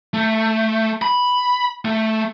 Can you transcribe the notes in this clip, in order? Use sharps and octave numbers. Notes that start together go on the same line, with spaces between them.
A3
B5
A3